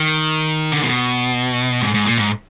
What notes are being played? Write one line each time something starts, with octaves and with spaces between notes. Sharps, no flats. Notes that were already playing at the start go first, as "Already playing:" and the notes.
Already playing: D#3
D3
B2
G#2
G#2
A#2
G#2